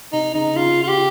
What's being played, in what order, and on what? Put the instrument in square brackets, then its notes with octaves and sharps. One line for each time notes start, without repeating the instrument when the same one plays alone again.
[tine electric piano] C3 [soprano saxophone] D#4
[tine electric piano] C#3 [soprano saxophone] D#4
[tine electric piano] C#3 [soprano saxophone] F4
[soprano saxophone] F4
G4